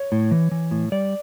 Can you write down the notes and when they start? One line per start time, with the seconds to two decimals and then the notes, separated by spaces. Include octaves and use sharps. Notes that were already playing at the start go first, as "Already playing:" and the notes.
Already playing: C#5
0.12 A2
0.31 E3
0.51 E3
0.71 A2
0.92 G3 D5